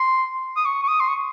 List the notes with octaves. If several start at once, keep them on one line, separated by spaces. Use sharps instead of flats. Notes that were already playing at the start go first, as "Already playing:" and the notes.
Already playing: C6
D#6
C#6
C#6
D#6
C6
C#6